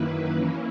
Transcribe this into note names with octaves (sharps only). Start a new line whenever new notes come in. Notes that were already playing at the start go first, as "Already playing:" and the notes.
Already playing: F#2 D#3 A#3 E4 B4
E3 A#3 C#4 E4